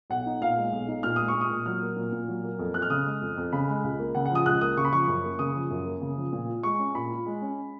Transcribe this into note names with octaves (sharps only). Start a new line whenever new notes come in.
B1 F#5
D#4
A#2 F5
G#3
B1
D#4
A#2 F6
G#3 D#6
C#6
A#2
D#6
A#2
F#3 F6
A#3
A#2
A#2
F#3
A#3
F2
F2 F#6
F6
C#3 D#6
G#3
F2
F2
C#3 B5
G#3
C#2
A#3
C#3 F#5
F#5
F3 D#6
C#2 F#6
A#3 D#6
C#3 C#6
B5
F3 C#6
F#2
A#3
C#3 D#6
F3
F#2
A#3
C#3
F3
A#2
F4
G#3 C#6
C#4
A#2 B5
F4
G#3
C#4